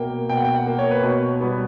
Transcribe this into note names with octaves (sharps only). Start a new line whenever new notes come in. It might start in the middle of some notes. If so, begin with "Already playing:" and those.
Already playing: B2 A#3 G5
B2 G5
F#5
G5
F#5
A#3
C#5
B4
B2 C#5
G3 B3